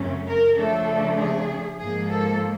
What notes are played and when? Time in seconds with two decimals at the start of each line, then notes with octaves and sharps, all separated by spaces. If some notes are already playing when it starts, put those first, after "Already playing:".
Already playing: F#2 C#3 F#3 A3 C#4
0.27 A#4
0.57 C#3 F3 A3 D4 A4
1.19 G#4
1.79 G#2 F3 A#3 G#4
2.10 A4